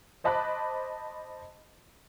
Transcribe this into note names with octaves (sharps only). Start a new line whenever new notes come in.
C5 D#5 A5 B5 D6 F#6